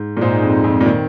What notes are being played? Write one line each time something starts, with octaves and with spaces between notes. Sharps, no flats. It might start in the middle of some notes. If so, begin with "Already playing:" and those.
Already playing: G#2
A#2
G#2 G#3 D#4 C5
F2
F2
A#2
D#3 C4